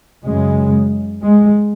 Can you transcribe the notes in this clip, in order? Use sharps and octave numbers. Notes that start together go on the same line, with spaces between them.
F#2 C#3 G#3
G#3